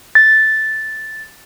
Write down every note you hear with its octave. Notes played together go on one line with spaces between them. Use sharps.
A6